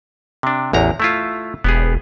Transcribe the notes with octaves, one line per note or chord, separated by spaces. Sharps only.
C3 D4
A1 E2 A#5
A3 E4 F4
E1 B3 G4 G#4